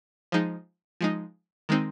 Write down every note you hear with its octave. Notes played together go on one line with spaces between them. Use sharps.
F3 G#3 D#4
F3 G#3 D#4
D#3 G#3 C4 D#4